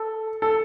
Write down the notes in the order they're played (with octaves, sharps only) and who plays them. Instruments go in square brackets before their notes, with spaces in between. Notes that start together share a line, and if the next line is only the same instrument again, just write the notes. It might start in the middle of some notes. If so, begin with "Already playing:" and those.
Already playing: [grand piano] A4
A4